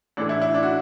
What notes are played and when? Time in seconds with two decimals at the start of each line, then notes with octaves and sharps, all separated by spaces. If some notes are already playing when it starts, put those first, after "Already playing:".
0.17 A1 A2 E3 A3 D4
0.29 E4
0.42 E4
0.54 D4
0.63 F#4